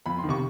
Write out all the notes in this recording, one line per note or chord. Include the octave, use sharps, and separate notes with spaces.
F2 B5
C6
D#3
C3 C#6